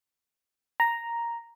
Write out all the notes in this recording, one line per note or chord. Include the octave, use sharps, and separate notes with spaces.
A#5